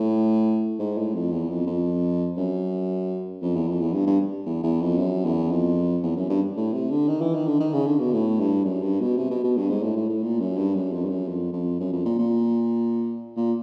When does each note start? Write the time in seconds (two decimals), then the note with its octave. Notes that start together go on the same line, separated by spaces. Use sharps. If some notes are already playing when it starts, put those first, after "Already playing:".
Already playing: A2
0.79 G#2
0.98 A2
1.14 F2
1.32 E2
1.49 F2
1.67 F2
2.37 F#2
3.42 F2
3.55 E2
3.68 F2
3.81 E2
3.94 G2
4.07 G2
4.46 E2
4.63 E2
4.81 F2
4.98 F#2
5.25 E2
5.51 F2
6.03 E2
6.16 F#2
6.30 G2
6.56 A2
6.73 C3
6.91 D3
7.08 D#3
7.21 E3
7.35 D#3
7.47 D3
7.60 D#3
7.73 C#3
7.86 D3
8.00 B2
8.13 A2
8.40 G2
8.65 F#2
8.83 G2
9.01 B2
9.17 C3
9.31 B2
9.44 B2
9.57 G2
9.70 G#2
9.83 A2
9.96 A2
10.09 A2
10.23 A#2
10.40 F#2
10.57 G2
10.75 F#2
10.92 F2
11.05 G2
11.09 F#2
11.28 F2
11.53 F2
11.80 F#2
11.92 F2
12.05 A#2
12.18 A#2
13.36 A#2